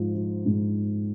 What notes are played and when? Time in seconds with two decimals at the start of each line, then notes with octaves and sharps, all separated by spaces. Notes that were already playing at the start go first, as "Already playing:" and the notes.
Already playing: G#2 F3
0.15 F3
0.46 G#2